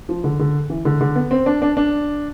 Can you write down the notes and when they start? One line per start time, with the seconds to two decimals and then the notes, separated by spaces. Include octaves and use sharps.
0.09 F3
0.24 D3
0.39 D3
0.70 E3
0.85 D3
1.01 D3
1.16 B3
1.31 C4
1.46 D4
1.62 D4
1.77 D4